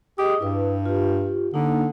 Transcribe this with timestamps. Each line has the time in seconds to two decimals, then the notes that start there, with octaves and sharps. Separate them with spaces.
0.18 G4 G#4 D#5 D#6
0.41 G2 E4 B4
0.86 F4 G4
1.54 D3 A#3 D4 D#4